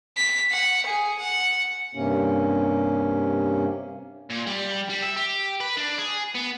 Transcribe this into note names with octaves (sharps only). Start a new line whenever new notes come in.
B6
F#5
G#4
F#5
G2 C3 A#3 C#4
A#2
G3
G3
E5
G4
B4
D4
G#4
B3